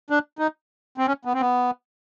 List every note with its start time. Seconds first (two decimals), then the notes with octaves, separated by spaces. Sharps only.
0.10 D4
0.39 D#4
0.98 C4
1.07 C#4
1.25 B3
1.34 C4
1.41 B3